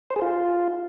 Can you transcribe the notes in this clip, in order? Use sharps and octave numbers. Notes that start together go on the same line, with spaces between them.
C5
G#4
F4